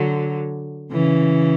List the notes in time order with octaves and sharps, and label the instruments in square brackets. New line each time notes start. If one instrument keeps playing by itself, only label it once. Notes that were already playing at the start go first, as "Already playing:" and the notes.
Already playing: [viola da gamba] D3 F#3
C#3 E3